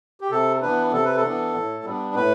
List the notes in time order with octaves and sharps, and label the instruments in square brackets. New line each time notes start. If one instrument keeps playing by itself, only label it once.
[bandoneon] G4
C3 A4
E3 B3 D4 B4
C3 A4
B4
A4
E3 B3 D4
A2
G3 B3 D4
A2 B4